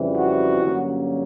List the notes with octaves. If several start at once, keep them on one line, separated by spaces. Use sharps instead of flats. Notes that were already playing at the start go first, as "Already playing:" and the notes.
Already playing: F2 C#3 E3 G3 C4
F#4
G2 D3 F#3 A#3 C#4